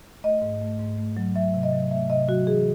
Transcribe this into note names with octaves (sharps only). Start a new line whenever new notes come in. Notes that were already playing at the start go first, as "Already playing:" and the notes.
A3 D#5
G#2
A3
G#2
A3
F#3
F#3 E5
C3
D#5
F#3
A3 E5
C3 D#5
F#3 F#4
E3 G#4